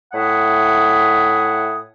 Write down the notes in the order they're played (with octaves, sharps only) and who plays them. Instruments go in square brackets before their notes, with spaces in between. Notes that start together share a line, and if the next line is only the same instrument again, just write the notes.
[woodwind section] A2 E5 F#5 G#5 D#6